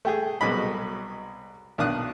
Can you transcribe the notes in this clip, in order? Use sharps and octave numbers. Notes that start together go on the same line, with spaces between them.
A3 G4 G#4
C2 B2 F#3 G#3 D#5 B5
B1 D#3 D4 F5 D#6 F#6